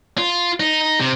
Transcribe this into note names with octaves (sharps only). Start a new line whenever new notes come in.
F4
D#4
C3